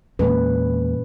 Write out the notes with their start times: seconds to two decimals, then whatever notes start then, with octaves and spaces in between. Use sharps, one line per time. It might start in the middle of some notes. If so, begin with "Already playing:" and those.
0.19 E2 A#2 G#3 A#3 C#4 B4